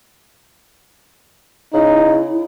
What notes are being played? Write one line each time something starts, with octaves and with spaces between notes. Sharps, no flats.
C#3 D#4 E4